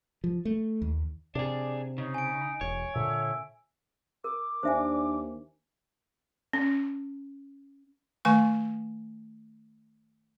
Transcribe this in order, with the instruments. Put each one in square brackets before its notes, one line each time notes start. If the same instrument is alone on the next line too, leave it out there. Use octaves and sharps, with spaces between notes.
[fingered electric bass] F3
A3
D#2
[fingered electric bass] C3 [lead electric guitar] D4 G#4 [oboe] D5
[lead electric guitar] C#3 [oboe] D#4
[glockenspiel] G#5 D7
[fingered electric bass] E1 [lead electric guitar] C#5
[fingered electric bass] A#2 D3 [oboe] E5
[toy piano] A#4 [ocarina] D6
[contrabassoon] D#2 [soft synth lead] D4 [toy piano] C5 E5 G#5
[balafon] C#4
D#3 A3 G#5 C#6